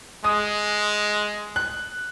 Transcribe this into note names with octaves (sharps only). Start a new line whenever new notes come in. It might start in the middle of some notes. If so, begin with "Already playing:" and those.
G#3 D#6
F#6